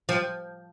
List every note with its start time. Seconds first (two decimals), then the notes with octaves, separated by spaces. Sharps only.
0.09 F3